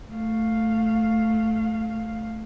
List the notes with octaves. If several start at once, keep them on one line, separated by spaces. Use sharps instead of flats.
A3 F5